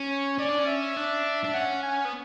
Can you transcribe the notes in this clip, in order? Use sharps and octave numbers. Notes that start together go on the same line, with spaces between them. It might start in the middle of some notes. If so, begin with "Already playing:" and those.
Already playing: C#4
C#5
C#4 D5
D4
C#4
E5
D4
D4
C#4 F#5
G#5
B3